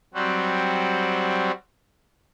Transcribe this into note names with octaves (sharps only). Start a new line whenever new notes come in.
F#3 G3 C4 F#4